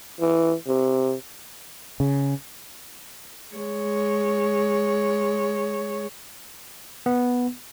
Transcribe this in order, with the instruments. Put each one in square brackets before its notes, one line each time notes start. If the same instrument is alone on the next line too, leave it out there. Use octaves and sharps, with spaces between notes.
[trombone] E3
C3
[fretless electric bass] C#3
[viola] G#3 C#5
[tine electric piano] B3